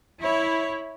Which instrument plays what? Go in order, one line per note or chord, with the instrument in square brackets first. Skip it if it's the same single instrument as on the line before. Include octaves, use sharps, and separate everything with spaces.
[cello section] E4 [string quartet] C#5